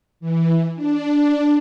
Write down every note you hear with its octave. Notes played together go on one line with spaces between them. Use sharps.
E3
D4